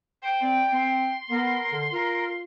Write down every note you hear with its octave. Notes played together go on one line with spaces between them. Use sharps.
C5 G5
C4 D5
C4 C6
B3 A#4
D3
F4 A#4